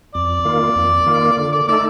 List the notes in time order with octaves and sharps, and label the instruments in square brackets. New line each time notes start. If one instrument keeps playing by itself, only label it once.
[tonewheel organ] F2 [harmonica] D5
[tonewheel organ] D#3 A#3 F4
F2
D#3 A#3 F4
[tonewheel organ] D3 [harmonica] D5
[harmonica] D5
[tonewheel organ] A3 D#4 A4 [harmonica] D5